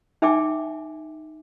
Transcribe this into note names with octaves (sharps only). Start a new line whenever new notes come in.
D#4 E5 G5 G#5 D6